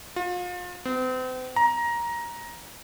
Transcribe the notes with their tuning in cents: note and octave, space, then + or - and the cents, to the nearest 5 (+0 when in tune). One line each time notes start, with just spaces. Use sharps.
F4 +35
C4 -40
A#5 +15